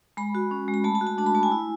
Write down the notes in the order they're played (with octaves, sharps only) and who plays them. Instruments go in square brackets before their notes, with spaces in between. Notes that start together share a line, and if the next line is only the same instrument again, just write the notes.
[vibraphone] G#3 B5
F#4
C#4
G#3
B5
A3 A5
A5
F#4
A5
D4 A5
B5
A3 A5
G#5
E4